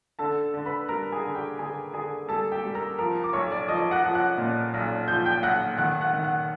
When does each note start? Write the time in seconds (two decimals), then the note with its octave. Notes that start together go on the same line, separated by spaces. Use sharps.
0.19 D3 A4 A5
0.54 D3
0.66 B4 B5
0.89 G3 A#4 A#5
1.12 G#4 G#5
1.25 D3
1.35 G4 G5
1.59 D3 G#4 G#5
1.93 D3 G#4 G#5
2.29 G3 A4 A5
2.52 G4 G5
2.64 G3
2.75 A#4 A#5
2.99 F3 A#4 A#5
3.24 D6
3.33 B1 C#5 C#6
3.51 D5 D6
3.68 F3 D#5 D#6
3.91 F#5 F#6
4.04 F3
4.15 F#5 F#6
4.38 A#2
4.74 B1
5.08 F3 G6
5.25 G5 G6
5.43 B1 F#5 F#6
5.78 D#3 F#5 F#6
6.01 F#5 F#6
6.13 D#3
6.24 F#5 F#6